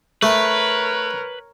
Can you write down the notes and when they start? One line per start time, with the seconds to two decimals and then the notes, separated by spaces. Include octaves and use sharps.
0.23 A3 A#4 B4 C#5